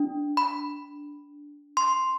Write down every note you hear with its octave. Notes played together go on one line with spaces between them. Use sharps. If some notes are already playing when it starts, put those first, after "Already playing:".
Already playing: D4
B5
C6